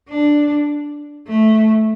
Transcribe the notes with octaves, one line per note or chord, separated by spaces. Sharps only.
D4
A3